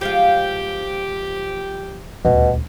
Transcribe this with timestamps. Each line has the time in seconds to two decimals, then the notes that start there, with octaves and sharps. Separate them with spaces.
0.01 F3 G#3 F4 G4
2.25 D#1 D2 B2